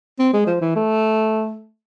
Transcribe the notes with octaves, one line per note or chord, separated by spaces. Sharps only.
C4
G#3
F3
E3
A3